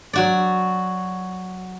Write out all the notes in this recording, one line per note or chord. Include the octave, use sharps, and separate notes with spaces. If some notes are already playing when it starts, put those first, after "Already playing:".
F#3 F#4 D5